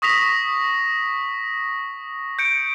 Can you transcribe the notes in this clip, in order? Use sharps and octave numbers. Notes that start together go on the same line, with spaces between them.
C#6 D#6 A#6 B6 F7
G6 C#7 D7